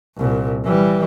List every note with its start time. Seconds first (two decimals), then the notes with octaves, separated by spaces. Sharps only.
0.17 C2 A#2
0.66 E3 G3